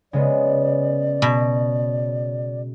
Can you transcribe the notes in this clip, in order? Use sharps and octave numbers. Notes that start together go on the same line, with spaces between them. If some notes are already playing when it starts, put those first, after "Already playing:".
C#3 G#3 B3 D5
B2